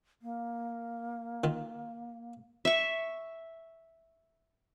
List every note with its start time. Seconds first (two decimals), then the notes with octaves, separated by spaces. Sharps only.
0.22 A#3
1.44 D#3 F4
2.65 E5 C#6